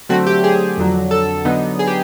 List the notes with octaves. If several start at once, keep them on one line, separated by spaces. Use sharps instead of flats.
D3 F#3 A3 C4 F#4
G4
G#4
F2 D3 F#3
A4
D3 F#3 B3 D#4
G#4
G4